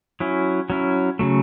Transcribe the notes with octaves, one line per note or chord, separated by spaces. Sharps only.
F#3 C#4 E4
F#3 C#4 E4
C#3 F#3 A3